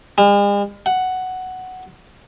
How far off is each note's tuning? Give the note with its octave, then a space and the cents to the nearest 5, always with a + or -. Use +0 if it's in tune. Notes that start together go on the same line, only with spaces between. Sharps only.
G#3 -45
F#5 +5